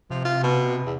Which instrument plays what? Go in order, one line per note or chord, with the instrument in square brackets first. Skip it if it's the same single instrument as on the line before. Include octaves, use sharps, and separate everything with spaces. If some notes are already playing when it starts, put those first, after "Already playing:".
[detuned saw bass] C3 [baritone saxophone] F3
[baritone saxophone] F4
B2
E2